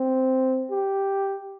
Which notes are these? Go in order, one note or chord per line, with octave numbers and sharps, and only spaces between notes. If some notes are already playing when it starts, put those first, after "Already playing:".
Already playing: C4
G4